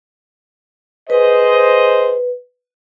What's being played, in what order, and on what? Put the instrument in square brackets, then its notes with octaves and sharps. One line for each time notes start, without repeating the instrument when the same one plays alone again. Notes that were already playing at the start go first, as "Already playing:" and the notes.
[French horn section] G#4 C5 D#5 [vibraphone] B4